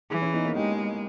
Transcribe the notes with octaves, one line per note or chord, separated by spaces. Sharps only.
E3 E4 G#4
C#4 E4
B3 D#4
A#3 C#4
G#3 D#4 G4